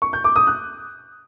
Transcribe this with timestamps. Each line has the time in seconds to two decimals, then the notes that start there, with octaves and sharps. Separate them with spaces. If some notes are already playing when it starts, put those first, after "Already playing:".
0.02 C#6
0.13 G6
0.24 D6
0.36 D#6
0.47 F#6